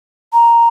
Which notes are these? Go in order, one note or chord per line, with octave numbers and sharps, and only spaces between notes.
A#5